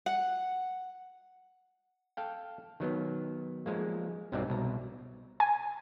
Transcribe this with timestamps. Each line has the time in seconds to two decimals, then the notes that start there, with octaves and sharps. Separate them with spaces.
0.06 F#5
2.17 A4 F5 G5
2.80 D#3 F#3 B3
3.66 F3 G#3 A#3
4.32 B1 G2 F#3 C4 D#4 D5
4.49 C2 B2 A#5
5.40 G#5